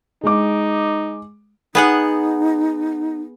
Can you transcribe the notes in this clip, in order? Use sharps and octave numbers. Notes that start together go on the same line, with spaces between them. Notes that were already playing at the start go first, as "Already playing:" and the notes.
G#3 D#4 D6
B3 D#4 G#4 F#5